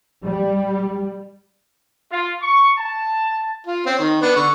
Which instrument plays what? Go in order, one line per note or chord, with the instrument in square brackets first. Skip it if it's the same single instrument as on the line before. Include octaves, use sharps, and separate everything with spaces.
[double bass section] G3
[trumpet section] F4
C#6
A5
[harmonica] F4
C4 C#4
D#3
B3 D4
D3 C#6